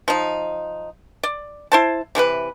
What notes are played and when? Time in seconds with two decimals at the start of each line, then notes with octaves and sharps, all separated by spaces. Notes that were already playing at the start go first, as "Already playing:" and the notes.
0.08 F3 D#4
1.23 D5
1.72 E4 C5 A5
2.15 C3 E3 C#4 B4